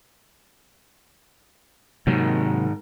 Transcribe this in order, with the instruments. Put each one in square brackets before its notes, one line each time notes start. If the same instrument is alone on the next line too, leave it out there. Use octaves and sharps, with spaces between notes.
[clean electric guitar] G#2 D#3 [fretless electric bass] C3 F#3 A#3